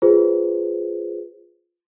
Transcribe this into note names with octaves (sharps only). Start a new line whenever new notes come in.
F4 G#4 B4 C5